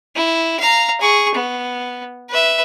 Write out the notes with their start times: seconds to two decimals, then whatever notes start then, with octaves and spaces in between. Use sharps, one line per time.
0.16 E4
0.60 F5 A#5
1.00 G#4 C#6
1.35 B3
2.30 B4 E5